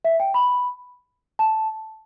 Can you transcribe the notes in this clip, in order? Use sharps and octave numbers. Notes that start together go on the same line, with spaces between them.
E5
G5
B5
A5